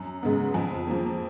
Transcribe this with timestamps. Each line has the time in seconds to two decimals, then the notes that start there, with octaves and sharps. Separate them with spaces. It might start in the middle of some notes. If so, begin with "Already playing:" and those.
Already playing: F#2
0.23 C#3 G#3 B3
0.54 F2
0.87 F3 A#3